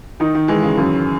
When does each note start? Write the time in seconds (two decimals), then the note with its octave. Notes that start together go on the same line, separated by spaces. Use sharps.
0.20 D#3 D#4
0.35 D#3
0.48 E3 G#3
0.62 C#3
0.78 F#2